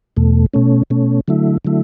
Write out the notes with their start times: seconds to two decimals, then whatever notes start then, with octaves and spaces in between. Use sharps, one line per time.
0.17 E2 B2 A3
0.54 B2 A3 C#4
0.90 B2 A3 C#4
1.28 D3 F#3 A3 E4
1.65 D3 F#3 A3 E4